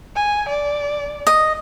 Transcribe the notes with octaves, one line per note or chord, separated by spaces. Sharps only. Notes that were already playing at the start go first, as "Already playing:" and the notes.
G#5
D5
D#5